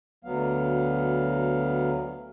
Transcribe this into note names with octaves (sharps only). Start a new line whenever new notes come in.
D2 F#3 B3 F5